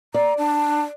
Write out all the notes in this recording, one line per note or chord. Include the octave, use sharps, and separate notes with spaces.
D5 A#5
D4